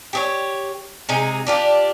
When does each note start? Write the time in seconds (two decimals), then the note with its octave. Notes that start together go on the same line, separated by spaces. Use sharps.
0.13 G4 G#4 C#5
1.09 C3 G#3 D#4 G#4
1.47 D4 F4 G4